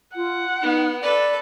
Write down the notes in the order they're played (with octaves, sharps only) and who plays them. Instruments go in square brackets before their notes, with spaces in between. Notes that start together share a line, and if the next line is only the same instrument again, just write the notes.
[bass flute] F4 [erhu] F#5
[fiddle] B3 [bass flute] D#4
[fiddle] A4 B4 [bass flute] D5